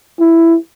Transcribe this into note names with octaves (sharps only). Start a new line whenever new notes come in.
E4